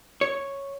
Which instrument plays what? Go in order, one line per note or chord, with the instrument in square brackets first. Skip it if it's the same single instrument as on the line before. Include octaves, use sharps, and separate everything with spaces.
[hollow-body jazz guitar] C#5